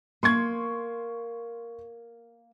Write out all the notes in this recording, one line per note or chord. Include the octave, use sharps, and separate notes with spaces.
A#3 C6 C#6 G#6